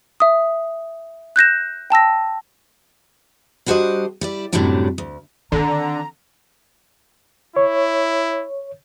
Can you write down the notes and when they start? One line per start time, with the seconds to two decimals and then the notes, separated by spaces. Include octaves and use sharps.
0.20 E5 D#6
1.36 F#6 G6 A#6 E7
1.90 G5 A5 E6 A#6
3.66 G3 D4 F#4 G4 C5 D#5
4.21 G3 E4 D5
4.53 F#2 A2 C3 F#3 G3 D4
4.98 D2
5.52 D3 D#3 C4 A#5
7.56 E4 C#5